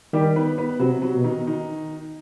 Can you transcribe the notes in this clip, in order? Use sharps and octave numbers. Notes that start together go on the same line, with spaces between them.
D#3 G3 G4
B3 B4
B3 B4
C3 F#3 F#4
F#3 F#4
B2
D#3 D#4
D#3 D#4